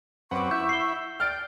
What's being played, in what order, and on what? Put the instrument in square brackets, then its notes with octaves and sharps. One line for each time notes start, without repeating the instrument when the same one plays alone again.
[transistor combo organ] F#2 C4 B4 [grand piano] F#5 D6 [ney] C#6
[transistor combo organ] E4 E5 [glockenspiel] G6
[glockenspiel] C7 G7
[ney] D5 [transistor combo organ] G5 [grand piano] F6 A6 D7